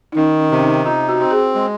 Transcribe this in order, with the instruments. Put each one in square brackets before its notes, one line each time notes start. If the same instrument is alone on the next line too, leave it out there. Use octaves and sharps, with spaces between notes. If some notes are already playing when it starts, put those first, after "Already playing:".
[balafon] D#4
[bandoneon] D#3 [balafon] C#4
[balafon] C#4
[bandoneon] C3
[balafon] C#4
D#4
[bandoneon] D#4 [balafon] F4
[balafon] F#4
[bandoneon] C4 [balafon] F#4
[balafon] G#4
[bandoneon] G#3